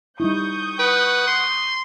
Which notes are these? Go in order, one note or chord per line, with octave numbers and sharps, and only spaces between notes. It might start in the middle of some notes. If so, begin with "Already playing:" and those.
G3 D#4 E4 C#6 D#6 G6
B4 F#5
C6